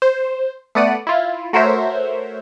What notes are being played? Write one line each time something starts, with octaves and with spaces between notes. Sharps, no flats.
C5
A3 B3 D5 F#5 D#7
E4 F4
A3 F#4 A#4 C5 C#5 E5